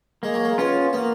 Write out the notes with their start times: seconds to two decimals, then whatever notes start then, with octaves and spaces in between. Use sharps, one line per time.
0.23 G#3 A#3
0.34 F#3
0.44 G#3
0.58 B3 C#4 F4
0.93 A#3 B3